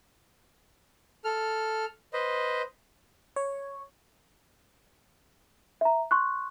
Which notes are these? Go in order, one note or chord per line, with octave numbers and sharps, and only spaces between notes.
A4 F6
B4 C5 D#5
C#5
E5 A#5
C6 C#6 F#6